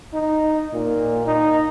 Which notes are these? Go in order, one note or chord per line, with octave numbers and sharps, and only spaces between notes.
D#4
A#2
D#4